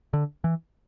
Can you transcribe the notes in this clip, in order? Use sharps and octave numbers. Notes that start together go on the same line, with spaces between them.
D3
E3